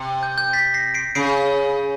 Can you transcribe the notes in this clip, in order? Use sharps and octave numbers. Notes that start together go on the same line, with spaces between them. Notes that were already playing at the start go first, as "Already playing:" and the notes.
Already playing: C3
G6
G6
A6 B6
A#6 C7
C7 D7
C#3 C7 D7